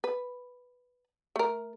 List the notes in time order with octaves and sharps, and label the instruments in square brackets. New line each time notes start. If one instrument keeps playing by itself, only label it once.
[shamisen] B4
A3 A#4